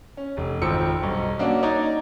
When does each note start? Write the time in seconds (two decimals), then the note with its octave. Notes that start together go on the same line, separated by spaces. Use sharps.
0.17 C#4
0.37 F1
0.61 G#1 F2 F3 C5 E6 C#7
1.02 B1 G2
1.39 A#3 C#4 D4 F#4
1.63 D#4 C#5 D5 A#5